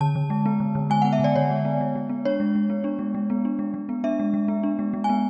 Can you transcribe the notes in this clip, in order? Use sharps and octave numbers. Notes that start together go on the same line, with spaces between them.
D3 A5
D3
G#3
B3
D3
D3
G#3 G#5
F#5
B3
E5
D3 D5
D3 C#5
G#3
B3
G#3
G#3
B3
D4 C#5
G#3
G#3
B3
D4
G#3
G#3
B3
D4
G#3
G#3
B3
D4 E5
G#3
G#3
B3
D4
G#3
G#3
G#5
B3